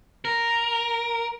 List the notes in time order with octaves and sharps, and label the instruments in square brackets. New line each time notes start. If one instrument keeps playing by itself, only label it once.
[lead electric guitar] A#4